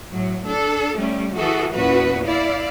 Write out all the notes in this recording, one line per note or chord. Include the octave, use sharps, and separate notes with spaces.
A2 F#3
D4 A4
G3 A3 C#4
E3 F#4 G#4 A4
E2 A#2 B3 C#4 F#4 B4
E4 D5 F5